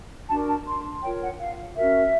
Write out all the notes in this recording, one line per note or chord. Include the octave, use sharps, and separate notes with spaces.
D4 F#4 A#4 A5
A5
C6
F4 A#4 C#5 G5
F#5
F5
C#4 F#4 A#4 E5